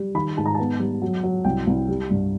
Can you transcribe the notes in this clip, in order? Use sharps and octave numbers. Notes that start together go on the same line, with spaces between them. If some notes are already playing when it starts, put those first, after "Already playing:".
Already playing: G3
D#3 B5
G#2 A5
A#5
B3 A5
G3
F#3
F#3
C2 G5
C2
G3
G2